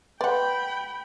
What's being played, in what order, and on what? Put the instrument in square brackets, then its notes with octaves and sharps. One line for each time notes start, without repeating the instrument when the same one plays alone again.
[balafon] B4 C6 [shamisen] D5 F#5 [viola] G5 B5